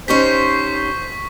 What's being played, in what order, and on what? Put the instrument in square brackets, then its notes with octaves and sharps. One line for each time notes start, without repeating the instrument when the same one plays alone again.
[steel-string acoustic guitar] C#4 D#4 G4 [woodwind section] C5 [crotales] C#6 B6